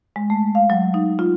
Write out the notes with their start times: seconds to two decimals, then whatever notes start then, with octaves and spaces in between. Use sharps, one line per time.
0.16 G#3
0.30 A3
0.55 F5
0.70 F#3
0.94 D#4
1.19 F4